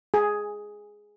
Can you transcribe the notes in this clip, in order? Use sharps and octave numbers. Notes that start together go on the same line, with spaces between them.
G#4